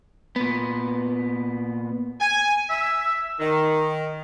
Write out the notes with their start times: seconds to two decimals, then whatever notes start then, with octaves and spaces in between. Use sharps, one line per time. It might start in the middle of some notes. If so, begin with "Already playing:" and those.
0.36 A#2 B3
2.20 G#5
2.70 E5
3.40 D#3